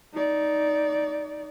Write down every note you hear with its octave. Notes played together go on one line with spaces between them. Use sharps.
D#4 D5